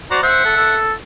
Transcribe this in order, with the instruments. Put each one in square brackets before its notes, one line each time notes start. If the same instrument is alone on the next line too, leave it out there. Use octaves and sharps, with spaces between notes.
[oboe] F#4 [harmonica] C5 D5 A#5
[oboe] C5 [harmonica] E5 F#5
[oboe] A4
A4